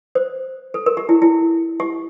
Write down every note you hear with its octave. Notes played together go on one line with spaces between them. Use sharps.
C5
A4
A#4
G4
E4
E4
G4